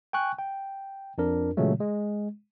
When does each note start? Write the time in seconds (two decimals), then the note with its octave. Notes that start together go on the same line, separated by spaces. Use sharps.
0.13 G5 G#5 C#6 F#6
0.39 G5
1.18 F2 D4 A#4
1.57 A#2 C#3 E3 F#3 G#3 A3
1.80 G#3